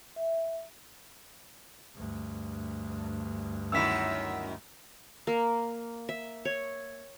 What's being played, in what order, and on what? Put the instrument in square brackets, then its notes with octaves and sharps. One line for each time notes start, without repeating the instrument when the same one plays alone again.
[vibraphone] E5
[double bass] D2 G2
[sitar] F#2 D#3 E4 [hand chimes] E6 B6
[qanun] A#3
E5
C#5